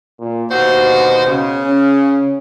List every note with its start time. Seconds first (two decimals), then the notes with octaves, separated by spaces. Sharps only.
0.20 A#2
0.50 D#2 B2 F#4 C5
1.26 C#3
1.63 C#4